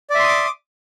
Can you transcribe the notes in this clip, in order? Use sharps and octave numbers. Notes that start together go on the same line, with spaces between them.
D5 E5 C6 D6 D#6